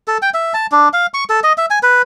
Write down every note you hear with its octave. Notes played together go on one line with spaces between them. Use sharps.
A4
G5
E5
A5
D4
F5
C#6
A4
D#5
E5
G#5
B4